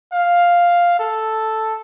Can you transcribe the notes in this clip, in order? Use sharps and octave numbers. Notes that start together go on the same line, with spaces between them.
F5
A4